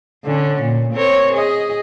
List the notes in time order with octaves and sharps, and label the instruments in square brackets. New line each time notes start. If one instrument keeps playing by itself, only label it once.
[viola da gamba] D3 C#4
A#2
C4 A#4 C#5
G#4 D#5